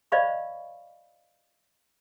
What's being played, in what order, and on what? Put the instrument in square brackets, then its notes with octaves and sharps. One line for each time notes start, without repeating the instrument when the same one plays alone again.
[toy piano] C5 D5 D#5 F5 B5 C#6